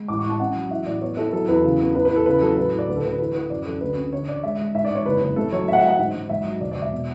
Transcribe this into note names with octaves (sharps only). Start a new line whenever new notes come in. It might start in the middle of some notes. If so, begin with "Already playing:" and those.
Already playing: G#3
A1 D6
C#6
A1 A5
C#4 F#5
F#3
E3 E5
A2 D5
B3 C#5
E4 A4
F#3 A4
E2 B4
C#3
B3
E2 B4
B4
E2
A4
C#3 B4
F#3 A4
A2 B4
A2
D5
D2 B4
A4
D2 B4
E3 B4
E3 B4
F#2 D5
F#2 A4
D2 B4
C#4
D3 C#5
D3 D5
G#3 E5
G#3
G#2 E5
D5
G#2
C#5
F#1 B4
F#1
A3 A4
F#3 C#5
A3 E5
F#5
E5
A3 F#5
G#2
G#2
G#1 E5
F#3
E1 D5
D5
E1
E5
B2